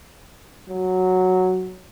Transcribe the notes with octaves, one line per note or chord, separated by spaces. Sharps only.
F#3